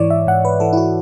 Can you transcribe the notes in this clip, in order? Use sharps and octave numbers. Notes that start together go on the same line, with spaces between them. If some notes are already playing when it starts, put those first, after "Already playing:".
Already playing: G#2 E3 C#5 D5
E5
G#2 F#5
B4
E3 A4
E4
F#4